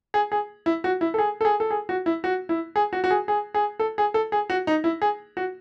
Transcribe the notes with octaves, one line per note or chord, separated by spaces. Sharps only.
G#4
G#4
E4
F#4
E4
A4
G#4
A4
G#4
A4
G#4
F#4
E4
F#4
E4
G#4
F#4
F#4
G#4
G#4
G#4
A4
G#4
A4
G#4
F#4
D#4
E4
G#4
F#4